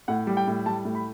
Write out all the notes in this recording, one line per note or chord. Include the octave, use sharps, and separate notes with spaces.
A2 F#5
G3
G5
A2
G3 A5
A2
B5